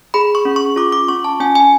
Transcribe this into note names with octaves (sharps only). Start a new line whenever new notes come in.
G#4 B5
C#6
C#4
C#6
F4 D6
D6
C#4 C#6
A5
C#4 G#5
G#5